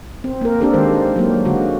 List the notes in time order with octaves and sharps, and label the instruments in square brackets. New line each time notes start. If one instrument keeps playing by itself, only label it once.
[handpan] C4
A#3 A#4
C4 D4 G4 A4 A#4
D#3 G#3 C5
F#3 A#3
D3 G#3 F#4